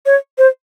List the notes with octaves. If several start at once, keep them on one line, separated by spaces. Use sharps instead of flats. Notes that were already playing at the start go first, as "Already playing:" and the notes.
C#5
C5